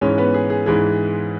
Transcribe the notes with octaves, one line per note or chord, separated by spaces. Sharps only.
G#2 E3 G#3 C#4 C#5
B3 B4
G#4
G#4
G#2 E3 G#3 G#4